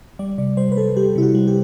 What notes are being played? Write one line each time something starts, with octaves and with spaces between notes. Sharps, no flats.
G3 D5
C3 D5
G3 C5
B4
G3 A4
G3 G4
C3 E4
F#4
G3
G4